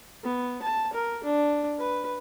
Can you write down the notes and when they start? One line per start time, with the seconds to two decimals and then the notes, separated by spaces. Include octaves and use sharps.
0.24 B3
0.63 A5
0.93 A#4
1.24 D4
1.79 B4